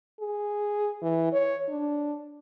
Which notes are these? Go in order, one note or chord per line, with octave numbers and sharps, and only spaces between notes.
G#4
E3
C#5
D4